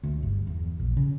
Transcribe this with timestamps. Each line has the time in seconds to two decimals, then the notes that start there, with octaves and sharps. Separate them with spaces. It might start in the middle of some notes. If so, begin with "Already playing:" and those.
0.03 D2
0.23 G1
0.47 E2
0.80 A#1
0.97 C#3